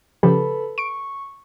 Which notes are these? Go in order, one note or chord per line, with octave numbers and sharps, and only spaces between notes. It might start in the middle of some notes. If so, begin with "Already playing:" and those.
C#3 F3 G4 A4 B4 B5
C#6 D7